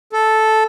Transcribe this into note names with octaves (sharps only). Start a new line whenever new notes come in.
A4